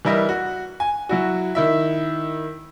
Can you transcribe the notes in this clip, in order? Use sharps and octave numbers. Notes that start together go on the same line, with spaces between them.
E3 G3 E4 A#4 D#5
F#4
G#5
F#3 E4 F#4
D#3 E4 E5